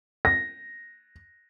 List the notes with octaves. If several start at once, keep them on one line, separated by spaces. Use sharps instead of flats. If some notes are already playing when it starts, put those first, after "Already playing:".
A#6